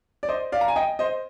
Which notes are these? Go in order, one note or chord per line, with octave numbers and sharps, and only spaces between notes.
D5
C5 D#5
D5 F5
A#5
G#5
D#5 G5
C5 D#5